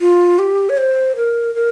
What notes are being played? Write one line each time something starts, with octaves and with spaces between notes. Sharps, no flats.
F4
G4
C#5
C5
A#4
A#4